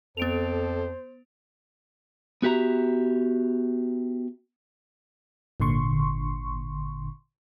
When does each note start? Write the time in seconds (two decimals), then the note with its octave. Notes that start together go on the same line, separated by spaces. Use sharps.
0.17 F2 B3 A4 C5 D7 F7
2.42 B3 F#4 G4 E5 A#5
5.60 G#1 A#2 D3 C6 C#6